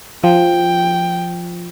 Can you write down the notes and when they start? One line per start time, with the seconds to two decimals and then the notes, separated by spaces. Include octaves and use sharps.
0.24 F3 G5